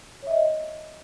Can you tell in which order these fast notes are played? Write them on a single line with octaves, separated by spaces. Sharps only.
C#5 E5 D#5